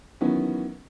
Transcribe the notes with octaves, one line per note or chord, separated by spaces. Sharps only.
D#3 E3 F#3 B3 C#4